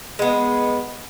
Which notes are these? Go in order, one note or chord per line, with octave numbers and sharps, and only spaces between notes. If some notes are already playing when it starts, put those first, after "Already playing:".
G#3 B3